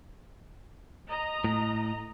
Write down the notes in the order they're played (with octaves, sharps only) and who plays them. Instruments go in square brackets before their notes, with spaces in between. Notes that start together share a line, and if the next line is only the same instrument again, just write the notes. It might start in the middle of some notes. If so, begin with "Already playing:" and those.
[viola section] D#5 A#5
[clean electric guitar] A2